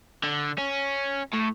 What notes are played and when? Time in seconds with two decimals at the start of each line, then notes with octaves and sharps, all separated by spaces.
0.24 D3
0.58 C#4
1.33 A2